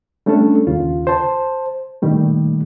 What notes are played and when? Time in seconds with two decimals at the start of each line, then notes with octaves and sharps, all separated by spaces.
0.26 G3 A3 C#4 D4 A4
0.67 D#2 C#3 F4
1.07 C5 A5
2.02 A#2 D#3 G3 A3